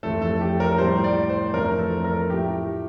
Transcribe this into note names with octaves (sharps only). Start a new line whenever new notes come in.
F2 E3 A3 A4
A4
G4
A#4
A2 G3 C5
D5
C5
F2 E3 A3 A#4
A4
A#4
A2 F3 A3 G4